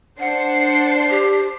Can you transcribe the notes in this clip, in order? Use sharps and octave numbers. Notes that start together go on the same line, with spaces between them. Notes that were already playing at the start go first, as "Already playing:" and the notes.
D4 C5 F#5 C7
G4